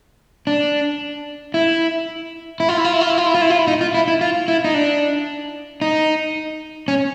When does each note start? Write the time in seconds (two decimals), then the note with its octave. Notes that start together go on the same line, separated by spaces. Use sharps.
0.47 D4
1.54 E4
2.60 E4
2.69 F4
2.77 E4
2.85 F4
2.93 E4
3.01 F4
3.10 E4
3.18 F4
3.26 E4
3.34 F4
3.41 E4
3.50 F4
3.59 E4
3.68 D#4
3.81 F4
3.94 E4
4.08 E4
4.21 F4
4.48 E4
4.64 D#4
4.74 D4
5.81 D#4
6.88 C#4